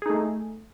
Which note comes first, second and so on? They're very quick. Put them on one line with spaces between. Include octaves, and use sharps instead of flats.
G#4 D#4 A3